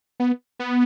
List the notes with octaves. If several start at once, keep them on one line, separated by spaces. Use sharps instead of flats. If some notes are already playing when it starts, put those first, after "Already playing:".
B3
B3